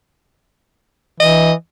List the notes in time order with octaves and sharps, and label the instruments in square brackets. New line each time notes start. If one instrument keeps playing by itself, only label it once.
[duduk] E3 [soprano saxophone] D#5